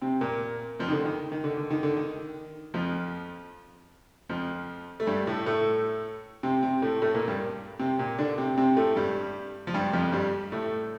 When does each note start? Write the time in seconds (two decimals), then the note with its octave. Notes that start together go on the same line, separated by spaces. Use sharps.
0.02 C3 C4
0.21 A#2 A#3
0.79 F2 F3
0.88 D#3
0.92 D3
1.05 D#3
1.32 D#3
1.44 D3
1.57 D3
1.70 D#3
1.83 D3
1.96 D#3
2.74 F2 F3
4.29 F2 F3
5.00 A3
5.07 G2 G3
5.27 A2 A3
5.46 A2 A3
6.43 C3 C4
6.62 C3 C4
6.82 A2 A3
7.02 A2 A3
7.15 A#2 A#3
7.28 G2 G3
7.79 C3 C4
7.98 A#2 A#3
8.18 D3 D4
8.38 C3 C4
8.57 C3 C4
8.77 A2 A3
8.96 G2 G3
9.67 F3
9.74 G2 G3
9.93 F2 F3
10.12 G2 G3
10.52 A2 A3